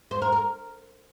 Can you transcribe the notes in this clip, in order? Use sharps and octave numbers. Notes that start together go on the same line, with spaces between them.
C5
A#4
A#4